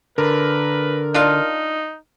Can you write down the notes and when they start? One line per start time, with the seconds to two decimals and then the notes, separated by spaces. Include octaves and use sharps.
0.18 D3 A#4 B4
1.14 D4 D#4 F4 F5